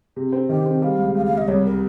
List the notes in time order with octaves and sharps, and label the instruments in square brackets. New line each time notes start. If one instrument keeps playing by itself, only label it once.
[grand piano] C3
C4
[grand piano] D#3 [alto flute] G4
[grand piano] C4
[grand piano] G3 [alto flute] F5
[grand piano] C#2
[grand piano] C#2 [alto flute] F5
[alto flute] F5
[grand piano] C#2
[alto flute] D#5
[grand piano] C2 [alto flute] C#5
[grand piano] G3 [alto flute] A#4